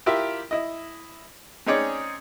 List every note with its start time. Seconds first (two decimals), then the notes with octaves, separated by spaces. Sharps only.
0.06 E4 F4 G4 A#4 E5
0.51 E4 D#5
1.66 C4 C#4 D#4 G#4 C#5 D5